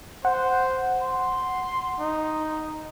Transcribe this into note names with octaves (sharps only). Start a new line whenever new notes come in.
C5 F#5
C6
D#4